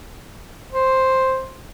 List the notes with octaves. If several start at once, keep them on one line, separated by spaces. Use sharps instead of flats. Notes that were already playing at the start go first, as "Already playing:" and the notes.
C5